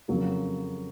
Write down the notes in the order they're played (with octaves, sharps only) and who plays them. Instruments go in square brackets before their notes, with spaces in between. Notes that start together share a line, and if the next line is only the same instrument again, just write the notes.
[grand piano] F2 C#3 F#3 A#3